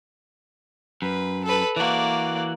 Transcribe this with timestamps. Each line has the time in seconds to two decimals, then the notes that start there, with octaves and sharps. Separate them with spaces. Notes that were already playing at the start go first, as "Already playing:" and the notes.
1.02 F#2 B4
1.45 A4 B4
1.76 E3 A#3 F#4 D5